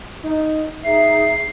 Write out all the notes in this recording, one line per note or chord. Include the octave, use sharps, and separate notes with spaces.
D#4
D#4 G#4 E5 C7